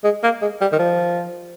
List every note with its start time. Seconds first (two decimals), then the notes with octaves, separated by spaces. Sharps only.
0.04 G#3
0.23 A#3
0.41 G#3
0.61 G3
0.72 D#3
0.79 F3